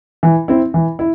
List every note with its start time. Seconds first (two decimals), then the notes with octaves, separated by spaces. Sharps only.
0.23 E3
0.48 C4 E4
0.74 E3
0.99 E4